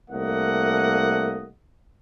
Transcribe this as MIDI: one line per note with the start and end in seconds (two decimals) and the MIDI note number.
0.10 1.48 36
0.10 1.48 57
0.10 1.48 58
0.10 1.48 75
0.10 1.48 78